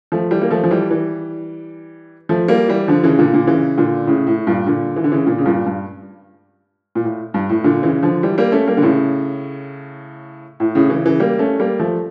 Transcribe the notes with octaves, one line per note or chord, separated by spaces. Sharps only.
F3 A3
E3 G3
A#3
F3 A3
F3
E3 G3
E3 G3
F3 A3
G3 A#3
E3 G3
D3 F3
C#3 E3
A#2 D3
A#2 D3
C#3 E3
A#2 D3
A2 C#3
A2
G2 A#2
A#2 D3
E3
D3
C#3 E3
A#2 D3
C#3
G2 A#2
G2
A#2
A2
G2
A2
A#2 D3
C#3 E3
D3 F3
E3 G3
G3 A#3
A3 C#4
G3 A#3
D3
A2 C#3
A2
A2 C#3
C#3 E3
C#3 E3
G3 A#3
A3 C#4
G3 A#3
F3 A3